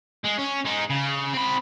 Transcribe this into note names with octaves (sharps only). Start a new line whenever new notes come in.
G#3
C#4
G#3 D#4
C#3
C4 B5